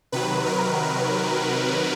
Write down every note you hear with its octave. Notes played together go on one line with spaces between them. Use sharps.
C3 D#3 F#3 B4
A#4